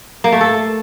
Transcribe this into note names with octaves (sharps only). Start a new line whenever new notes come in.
A#3
A3
A4